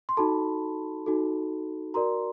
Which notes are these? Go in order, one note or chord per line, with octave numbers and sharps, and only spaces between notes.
C6
D#4 F#4 A4 A5 B5
D#4 F#4 A4
F#4 A#4 D5 A#5 C6